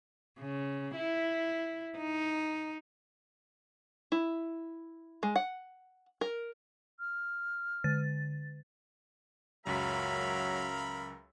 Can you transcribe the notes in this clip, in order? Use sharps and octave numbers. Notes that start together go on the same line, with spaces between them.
C#3
E4
D#4
E4
G#3
F#5
A#4
F6
D3 A6
C#2 F#2 F#3 A#4 E5 F5 B5 B6